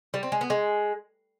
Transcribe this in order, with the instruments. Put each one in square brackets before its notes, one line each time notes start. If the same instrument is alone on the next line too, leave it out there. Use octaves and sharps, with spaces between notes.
[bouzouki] G3
C4
G#3
B3
G#3